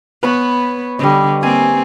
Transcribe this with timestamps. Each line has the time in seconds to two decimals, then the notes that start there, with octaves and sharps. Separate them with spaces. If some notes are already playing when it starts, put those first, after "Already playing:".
0.23 B3 B4 C#5 B5
0.99 D3 G3 D#5
1.43 A#3 C4 G#5